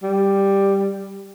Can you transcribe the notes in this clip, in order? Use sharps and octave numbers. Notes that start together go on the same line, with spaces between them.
G3